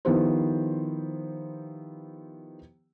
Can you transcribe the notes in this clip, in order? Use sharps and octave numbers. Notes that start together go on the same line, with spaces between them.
D#3 F3 B3 E4 G4 C5